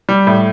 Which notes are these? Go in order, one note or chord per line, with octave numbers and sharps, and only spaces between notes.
G3
A2